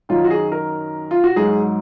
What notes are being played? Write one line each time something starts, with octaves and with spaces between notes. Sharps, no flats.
F#2 D#3 F#3 F4
F#4
G#4
A#4
F4
F#4
G#2 F#3 G#4